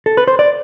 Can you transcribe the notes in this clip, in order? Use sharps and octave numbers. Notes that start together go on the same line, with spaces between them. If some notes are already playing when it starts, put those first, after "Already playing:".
A4
B4
C5
D5